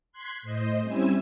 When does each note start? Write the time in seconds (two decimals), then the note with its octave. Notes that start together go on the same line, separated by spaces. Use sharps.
0.12 C6 F#6 G#6 B6 C7
0.42 A2 C5 D#5
0.82 G3 C4 C#4 E4 G#5 E6